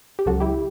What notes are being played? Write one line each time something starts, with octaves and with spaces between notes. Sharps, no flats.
G4
C#2 C#3 F#3 F#4 A4
E4 G4